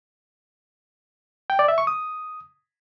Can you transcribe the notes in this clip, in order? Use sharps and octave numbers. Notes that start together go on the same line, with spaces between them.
G5
D5
E5
C#6
D#6